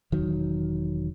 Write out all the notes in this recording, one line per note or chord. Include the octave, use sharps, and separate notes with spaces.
E1 D#3 F#3